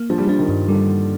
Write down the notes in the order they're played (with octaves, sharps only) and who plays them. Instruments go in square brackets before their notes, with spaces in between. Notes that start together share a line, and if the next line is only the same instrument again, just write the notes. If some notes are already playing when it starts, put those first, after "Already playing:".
Already playing: [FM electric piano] A#3
[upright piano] F3 [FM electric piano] D4
[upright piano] G3
[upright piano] F3 [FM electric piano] D4
[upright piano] D#3
[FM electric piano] G2
[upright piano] D3 [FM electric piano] G3